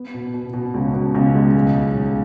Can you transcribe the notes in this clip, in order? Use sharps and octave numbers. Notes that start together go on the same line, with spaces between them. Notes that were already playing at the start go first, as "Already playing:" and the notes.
Already playing: B3
B2
B2
B2
C#2
B2
C#2
G#3
B1
B2
B1